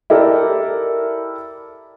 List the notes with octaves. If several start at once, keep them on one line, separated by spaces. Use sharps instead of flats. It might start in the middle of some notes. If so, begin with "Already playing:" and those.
E4 G4 A4 A#4 D5